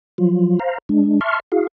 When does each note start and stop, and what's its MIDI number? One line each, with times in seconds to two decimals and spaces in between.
0.18 0.59 53
0.18 0.59 54
0.18 0.59 65
0.60 0.78 72
0.60 0.78 77
0.60 0.78 82
0.89 1.20 56
0.89 1.20 62
1.21 1.40 76
1.21 1.40 81
1.21 1.40 84
1.21 1.40 85
1.21 1.40 89
1.52 1.67 64
1.52 1.67 66
1.52 1.67 68
1.52 1.67 77